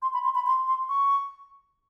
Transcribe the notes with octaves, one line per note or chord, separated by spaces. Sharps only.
C6
B5
C6
B5
C6
C6
C#6